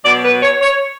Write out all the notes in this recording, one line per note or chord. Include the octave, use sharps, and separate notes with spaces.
B2 F#3 D5
B4
C#5
C#5